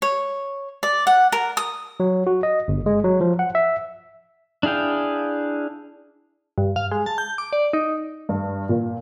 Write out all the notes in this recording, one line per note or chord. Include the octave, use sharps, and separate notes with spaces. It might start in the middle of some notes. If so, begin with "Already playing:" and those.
C#5
D5
F#5
A#4
D#6
F#3
F#4
D#5
G1
G#3
F#3
F3
F#5
E5
D4 E4 G#4 F5 G5
G2
F5
G#3
A5
G6
D6
D5
D#4
G2
A#2